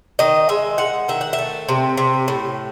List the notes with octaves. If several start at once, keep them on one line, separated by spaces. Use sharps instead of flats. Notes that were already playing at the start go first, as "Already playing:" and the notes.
D#3 D#5
G#3 E5
G#3 F#5
D#3 E5
F#5
E5
A3
C3
C3
A2